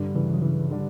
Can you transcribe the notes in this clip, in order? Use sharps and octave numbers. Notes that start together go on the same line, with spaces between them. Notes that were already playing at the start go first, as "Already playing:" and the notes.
Already playing: G2 D3 G3 D4
C#3 E3
F#3
C#3 E3
D3 G3 D4